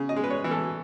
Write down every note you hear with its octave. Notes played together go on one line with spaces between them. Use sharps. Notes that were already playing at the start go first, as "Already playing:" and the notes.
Already playing: C#3
D#5
G#3
B4
C#5
E3
A4